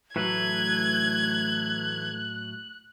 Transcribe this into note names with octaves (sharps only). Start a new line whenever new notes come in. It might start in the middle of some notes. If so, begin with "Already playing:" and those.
A2 E3 F#3 A3 B4 F#6 G#6